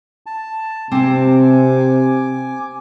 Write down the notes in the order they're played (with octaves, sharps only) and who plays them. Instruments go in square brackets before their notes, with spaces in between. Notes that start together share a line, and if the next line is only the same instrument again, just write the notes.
[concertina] A5
[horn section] C3 [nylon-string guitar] C4 A5 [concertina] G#5 D6